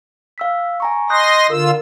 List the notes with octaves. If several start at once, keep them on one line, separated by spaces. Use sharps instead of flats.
F5 E6 B6
G#5 A#5 C#6
D#5 C6 D#6 F#6 G6 A#6
D3 F4 A#4 E6